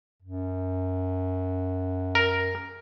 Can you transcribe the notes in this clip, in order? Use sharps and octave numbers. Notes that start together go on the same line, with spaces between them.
F#2
A#4